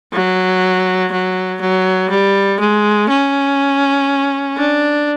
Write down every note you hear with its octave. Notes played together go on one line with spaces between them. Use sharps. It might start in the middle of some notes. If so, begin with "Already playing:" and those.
F#3
F#3
F#3
G3
G#3
C#4
D4